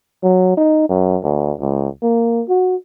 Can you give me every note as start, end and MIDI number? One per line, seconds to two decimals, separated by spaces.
0.23 0.56 54
0.57 0.85 63
0.89 1.17 42
1.23 1.52 38
1.60 1.88 37
2.03 2.43 58
2.49 2.76 66